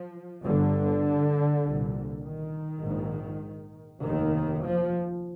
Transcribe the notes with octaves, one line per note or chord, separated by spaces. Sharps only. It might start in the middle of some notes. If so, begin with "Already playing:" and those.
Already playing: F3
G1 G2 D3
C2 A#2
D#3
A#1 G#2
F1 D#2 D#3
F3